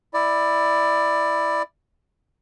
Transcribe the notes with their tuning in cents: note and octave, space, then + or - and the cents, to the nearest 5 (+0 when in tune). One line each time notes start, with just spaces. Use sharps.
E4 +0 D5 +15